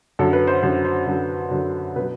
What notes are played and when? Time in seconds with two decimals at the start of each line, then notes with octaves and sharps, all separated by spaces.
0.19 F#2 D3 F#3 A4
0.33 B4
0.47 C5
0.63 F#2 D3 F#3 C5
0.85 C5
1.07 F#2 D3 F#3
1.51 F#2 D3 F#3
1.96 B2 B4
2.00 F#3